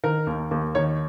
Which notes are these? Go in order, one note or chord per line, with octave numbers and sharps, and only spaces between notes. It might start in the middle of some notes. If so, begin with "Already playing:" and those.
D#3 A#4
D#2
D#2
D#3 C#5